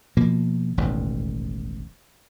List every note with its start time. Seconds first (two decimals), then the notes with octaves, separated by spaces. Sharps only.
0.17 B2 F3 A#3
0.77 E1 A1 D#2 B2